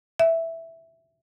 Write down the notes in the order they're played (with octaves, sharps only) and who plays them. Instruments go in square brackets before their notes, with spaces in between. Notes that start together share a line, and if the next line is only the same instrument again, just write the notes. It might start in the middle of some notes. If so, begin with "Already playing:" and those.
[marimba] E5